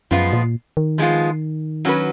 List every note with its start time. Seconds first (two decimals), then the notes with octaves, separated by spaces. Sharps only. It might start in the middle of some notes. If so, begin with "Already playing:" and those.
0.11 F#2 F3 G#3 B3 F4
0.33 A#2
0.77 D#3
0.98 F3 G#3 B3 F4
1.85 F#3 C#4 F#4 B4